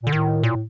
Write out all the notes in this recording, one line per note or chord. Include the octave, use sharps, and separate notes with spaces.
A#2 D3
A2 D#3
A#2